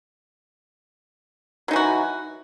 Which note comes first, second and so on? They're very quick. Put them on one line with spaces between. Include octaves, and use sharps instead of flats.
F#3 D#4 E3 F#4